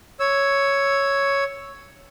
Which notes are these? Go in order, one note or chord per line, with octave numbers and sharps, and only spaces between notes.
C#5 E6